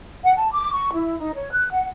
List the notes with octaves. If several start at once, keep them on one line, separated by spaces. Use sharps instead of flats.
F#5
A5
D6
C#6
E4
D#4
C#5
F#6
F#5